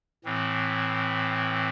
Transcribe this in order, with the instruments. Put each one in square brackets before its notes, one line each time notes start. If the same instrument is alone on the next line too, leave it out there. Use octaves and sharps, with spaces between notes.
[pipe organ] A2 E3 C4